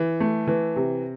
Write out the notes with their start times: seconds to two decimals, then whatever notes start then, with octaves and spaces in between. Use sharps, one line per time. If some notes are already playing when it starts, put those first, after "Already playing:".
Already playing: E3
0.20 A3
0.47 E3
0.76 C3